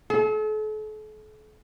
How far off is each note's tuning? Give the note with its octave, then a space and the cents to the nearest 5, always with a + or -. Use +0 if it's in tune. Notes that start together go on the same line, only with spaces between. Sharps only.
A4 -40